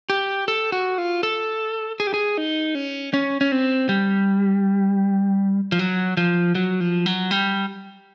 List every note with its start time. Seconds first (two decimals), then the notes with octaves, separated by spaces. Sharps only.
0.10 G4
0.48 A4
0.72 F#4
0.98 F4
1.23 A4
2.00 G#4
2.07 G4
2.14 G#4
2.38 D#4
2.75 C#4
3.14 C#4
3.41 C#4
3.52 C4
3.89 G3
5.72 F3
5.79 F#3
6.17 F3
6.55 F#3
6.80 F3
7.06 F#3
7.31 G3